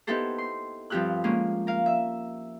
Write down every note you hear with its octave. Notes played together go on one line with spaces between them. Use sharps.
B3 D#4 E4 G4 A4 C5
C6
G2 F3 C4 G4 F6 F#6
G#3 A#3 C#4
A#4 F5
E5